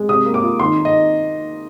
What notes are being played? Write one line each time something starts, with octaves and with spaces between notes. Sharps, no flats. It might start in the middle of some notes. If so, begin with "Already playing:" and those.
Already playing: G#3
C3 D#6
A#3
D6
F4
D#3 C6
D#4
D#5